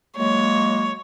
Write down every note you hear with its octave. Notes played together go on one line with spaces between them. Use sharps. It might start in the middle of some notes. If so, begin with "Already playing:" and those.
F#3 G#3 A#3 C#5